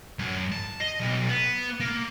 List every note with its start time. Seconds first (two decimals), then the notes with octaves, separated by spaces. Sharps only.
0.19 F#2
0.52 A5
0.80 D#5
1.00 B1
1.29 B3
1.80 A#3